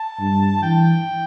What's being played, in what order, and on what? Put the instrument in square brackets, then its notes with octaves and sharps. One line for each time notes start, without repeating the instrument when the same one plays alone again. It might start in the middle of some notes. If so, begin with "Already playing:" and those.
Already playing: [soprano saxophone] A5
[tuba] G2
[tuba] E3 [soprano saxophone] G5